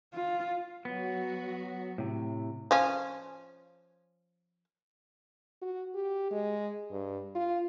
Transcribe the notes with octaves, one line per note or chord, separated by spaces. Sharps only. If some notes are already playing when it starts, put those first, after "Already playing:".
F4
F#3 B3 F#4
A2 C3
F3 C#4
F#4
G4
G#3
G2
F4